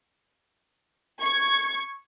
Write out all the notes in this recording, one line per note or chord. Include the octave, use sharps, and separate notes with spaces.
C#6 G#6